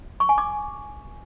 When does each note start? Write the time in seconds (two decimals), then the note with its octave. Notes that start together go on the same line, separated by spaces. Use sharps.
0.20 C#6
0.29 G#5
0.38 D6